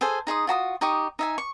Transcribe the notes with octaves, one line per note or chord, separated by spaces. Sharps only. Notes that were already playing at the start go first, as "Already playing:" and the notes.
G#4 A4 C5 G#5
D#4 G#4 C6 D#6
F4 F#4 A#5 D#6
D#4 G4 C#6 D#6
D#4 E5 G#5
C#6